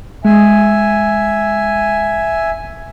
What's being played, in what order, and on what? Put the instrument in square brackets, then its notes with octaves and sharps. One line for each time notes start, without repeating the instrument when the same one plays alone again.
[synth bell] G#3 [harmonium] E5 G#5